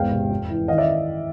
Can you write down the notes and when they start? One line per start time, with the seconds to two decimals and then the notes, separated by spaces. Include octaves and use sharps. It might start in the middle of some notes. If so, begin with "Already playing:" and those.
Already playing: G#1 E2 F5 G5
0.11 C3
0.30 F2
0.49 E3
0.68 D#3 D#5 F5
0.78 D5 E5